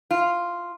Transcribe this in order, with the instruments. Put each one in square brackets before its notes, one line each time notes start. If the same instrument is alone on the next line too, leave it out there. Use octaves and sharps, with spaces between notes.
[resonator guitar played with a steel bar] F4